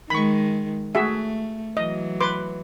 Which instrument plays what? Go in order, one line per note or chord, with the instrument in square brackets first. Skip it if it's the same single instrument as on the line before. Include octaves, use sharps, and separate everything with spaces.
[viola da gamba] D#3 G#3 [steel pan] B5 C#6
[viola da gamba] A3 [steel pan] F#4 G#4 E5
[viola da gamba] E3 F#3 [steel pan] D#5
[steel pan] B4 C6 D6